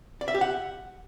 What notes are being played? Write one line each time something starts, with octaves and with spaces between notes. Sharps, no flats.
D5
E5
G4
F#5